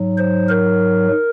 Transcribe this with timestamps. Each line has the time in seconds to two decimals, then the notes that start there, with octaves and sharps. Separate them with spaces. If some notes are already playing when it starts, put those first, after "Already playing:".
Already playing: G#2 F#3
0.18 C5
0.49 A#4